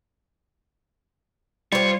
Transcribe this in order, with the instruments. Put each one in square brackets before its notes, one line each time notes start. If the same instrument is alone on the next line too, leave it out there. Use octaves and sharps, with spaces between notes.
[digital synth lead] G3 [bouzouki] F4 C5 [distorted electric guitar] C#5